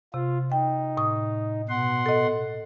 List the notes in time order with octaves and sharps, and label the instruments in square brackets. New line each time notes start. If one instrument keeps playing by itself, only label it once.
[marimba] C3 [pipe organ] F4
[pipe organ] D#4 [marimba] G5
[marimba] A2 D#6
[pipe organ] B2 F#5 C6
[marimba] A4 D#5